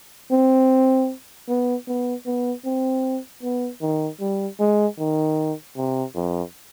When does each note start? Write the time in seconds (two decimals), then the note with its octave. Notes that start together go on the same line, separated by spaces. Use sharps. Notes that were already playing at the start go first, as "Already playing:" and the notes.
0.31 C4
1.48 B3
1.87 B3
2.26 B3
2.65 C4
3.43 B3
3.81 D#3
4.20 G3
4.59 G#3
4.98 D#3
5.77 C3
6.15 F2